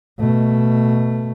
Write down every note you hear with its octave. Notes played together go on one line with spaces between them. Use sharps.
B2 A3